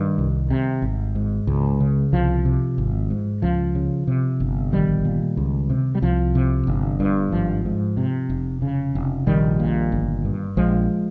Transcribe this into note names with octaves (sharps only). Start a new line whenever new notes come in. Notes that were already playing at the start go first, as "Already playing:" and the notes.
Already playing: G2 D#3 G3
C2
C3
G#1
G#2
C#2
C#3
C2 F3
C3
G#1
G#2
C#2 F3
C#3
C3
G1
A#1 D#3 G3
A#2
C#2
C3
G3
C2 F3
C3
G1
G2
G#1 F3
G#2
C3
F1
C#3
F1
A#1 D#3 G3
A#2
G1
G2
A#1 F3 G#3